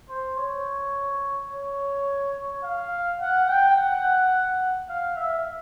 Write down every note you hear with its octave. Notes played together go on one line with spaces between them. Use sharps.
C5
C#5
C#5
F5
F#5
G5
F#5
F5
E5